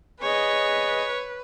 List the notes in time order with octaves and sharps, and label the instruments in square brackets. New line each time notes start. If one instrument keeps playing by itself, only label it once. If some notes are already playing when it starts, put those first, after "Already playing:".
[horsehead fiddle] G#4 D#5 [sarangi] B4 [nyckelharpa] C#5